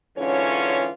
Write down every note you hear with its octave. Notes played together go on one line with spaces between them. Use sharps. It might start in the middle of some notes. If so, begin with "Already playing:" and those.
G#2 D3 E3 C#4 F4 C#5